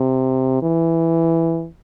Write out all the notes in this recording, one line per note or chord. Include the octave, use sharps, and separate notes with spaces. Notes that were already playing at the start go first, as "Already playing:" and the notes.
Already playing: C3
E3